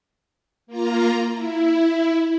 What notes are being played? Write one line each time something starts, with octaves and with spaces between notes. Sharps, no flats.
A#3 F4 A#5
E4